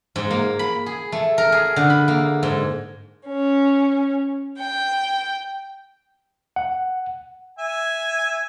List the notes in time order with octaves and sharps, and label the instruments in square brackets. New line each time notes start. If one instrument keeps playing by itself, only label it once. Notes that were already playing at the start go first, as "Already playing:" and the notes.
[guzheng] G#2
A#3
B5
G#4
A3
A#4
G#4
D3
B5
A#3
G#2
[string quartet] C#4
G5
[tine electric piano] F#5
[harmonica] E5 G#5